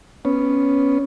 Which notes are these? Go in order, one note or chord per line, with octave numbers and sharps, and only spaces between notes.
B3 C#4